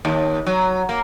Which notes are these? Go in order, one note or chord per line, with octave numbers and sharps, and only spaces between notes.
D#2
F#3
A#3